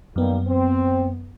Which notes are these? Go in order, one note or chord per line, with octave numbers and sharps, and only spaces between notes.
F#2 D#3 G3 A#3 B3
C4